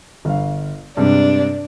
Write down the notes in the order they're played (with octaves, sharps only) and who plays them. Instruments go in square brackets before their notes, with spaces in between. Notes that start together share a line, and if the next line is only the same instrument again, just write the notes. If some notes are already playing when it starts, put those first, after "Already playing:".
[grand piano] G1 F5
[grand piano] G2 C3 G#3 [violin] D4